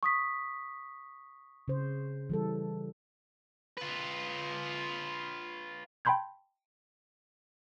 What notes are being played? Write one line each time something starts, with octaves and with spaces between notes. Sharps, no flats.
C#6 D#6 B6
C#3 C5
E3 G3 A4
F4 B4
G5 A5 B5 C6 G6 G#6